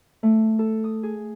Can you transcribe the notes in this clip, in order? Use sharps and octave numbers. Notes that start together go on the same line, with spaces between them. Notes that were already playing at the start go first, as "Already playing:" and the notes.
A3
A4
D#6
G#4